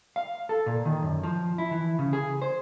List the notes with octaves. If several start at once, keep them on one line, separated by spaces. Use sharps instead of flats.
F5
A4
A#2
D#3
F#2
F3
E4
E3
C#3
G#4
C5